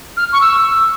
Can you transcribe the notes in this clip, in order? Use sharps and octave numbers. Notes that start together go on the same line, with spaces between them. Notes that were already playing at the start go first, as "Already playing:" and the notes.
F6
C#6
E6